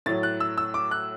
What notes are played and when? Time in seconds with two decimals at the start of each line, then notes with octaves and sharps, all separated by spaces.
0.06 A2 F#3 A6
0.23 F#6
0.40 E6
0.58 E6
0.74 D6
0.91 F#6